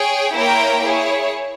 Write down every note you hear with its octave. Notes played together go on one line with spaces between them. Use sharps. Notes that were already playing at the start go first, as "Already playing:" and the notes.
Already playing: G#4 C#5 G5
A#3 E4 A#4 C#5 G5
E4 G#4 C#5